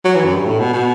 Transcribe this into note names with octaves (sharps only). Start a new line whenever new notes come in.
F#3
E3
F#2
G2
A2
B2
B2